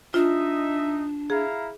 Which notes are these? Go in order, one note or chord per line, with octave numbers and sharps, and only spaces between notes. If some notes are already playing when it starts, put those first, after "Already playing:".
D4 D#4 F4 D#5 E5
E4 G#4 F5 A#5